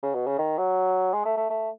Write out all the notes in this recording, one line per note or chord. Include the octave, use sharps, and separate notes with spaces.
C#3
B2
C#3
D#3
F#3
G#3
A3
A3
A3